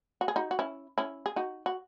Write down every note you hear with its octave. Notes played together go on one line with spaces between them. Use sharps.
F#4
G#4
D#4 F#4
F#4
C#4 E4
C#4 E4
G#4
D#4 F#4
F#4